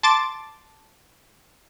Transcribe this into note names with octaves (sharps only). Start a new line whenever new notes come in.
A5 C6 D6 A6